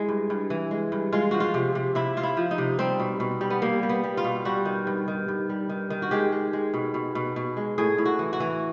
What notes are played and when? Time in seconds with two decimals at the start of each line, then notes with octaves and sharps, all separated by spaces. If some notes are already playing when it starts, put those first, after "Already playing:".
Already playing: G#3 E4
0.09 G2
0.30 G2
0.50 E3
0.71 G#3
0.92 G2
1.12 G#3 F4
1.31 F3 F#4
1.40 F4
1.54 C3
1.75 C3
1.95 C3 E4
2.17 C3 F4
2.23 E4
2.37 F3
2.51 D#4
2.58 C3
2.78 G3 C4
3.00 B2
3.20 B2
3.41 G3
3.50 B3
3.62 G3 A#3
3.83 G3
3.89 B3
4.04 G3
4.17 F4
4.24 B2
4.45 G3 F#4
4.65 D#3
4.87 G2
5.08 D#3
5.28 G2
5.49 G3
5.70 D#3
5.90 D#3
6.02 F#4
6.11 G#3 G4
6.32 G#3
6.53 G#3
6.74 B2
6.94 B2
7.15 B2
7.36 B2
7.57 G#3
7.78 A2 G#4
7.98 A2
8.05 F#4
8.19 E3
8.33 F#4
8.40 E3